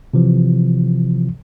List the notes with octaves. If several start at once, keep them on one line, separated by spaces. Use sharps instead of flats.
C3 E3 F3